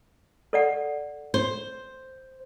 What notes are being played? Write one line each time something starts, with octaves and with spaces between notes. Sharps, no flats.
A4 D5 F#5
C5